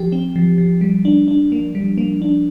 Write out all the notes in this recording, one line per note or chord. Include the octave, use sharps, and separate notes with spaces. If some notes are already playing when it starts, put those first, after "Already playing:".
Already playing: F3 G4
C4
F3
F3
G3
D4
D4
A#3
G3
A#3
D4